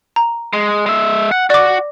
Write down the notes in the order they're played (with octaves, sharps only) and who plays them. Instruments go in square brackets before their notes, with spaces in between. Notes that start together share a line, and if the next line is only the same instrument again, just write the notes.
[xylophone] A#5
[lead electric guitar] G#3
G#3 E5
F#5
[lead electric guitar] F#4 [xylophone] D5 D6